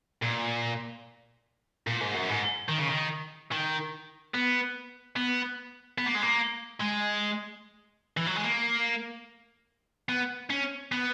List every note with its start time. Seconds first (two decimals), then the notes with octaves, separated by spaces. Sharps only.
0.23 A#2
1.87 A#2
2.01 G#2
2.15 F#2
2.29 G#2
2.69 D#3
2.78 C#3
2.88 D#3
3.51 D#3
4.34 B3
5.16 B3
5.98 B3
6.06 A#3
6.15 G#3
6.22 A#3
6.81 G#3
8.17 E3
8.26 F#3
8.36 G#3
8.44 A#3
10.09 B3
10.50 C#4
10.92 B3